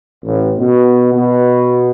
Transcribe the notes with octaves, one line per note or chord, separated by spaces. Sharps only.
A1
B2
B2